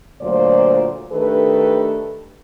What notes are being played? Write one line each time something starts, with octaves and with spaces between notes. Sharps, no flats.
D2 A#2 F#3 F4 C5 D5
D#3 A3 D4 G4 A4 B4